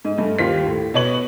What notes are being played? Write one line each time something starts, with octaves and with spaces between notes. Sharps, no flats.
G#2
G2 A3
D#2 F4 G4 C5 B6
A2
B2 B4 C#5 C#6 F#7